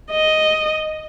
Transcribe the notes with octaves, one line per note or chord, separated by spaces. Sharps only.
D#5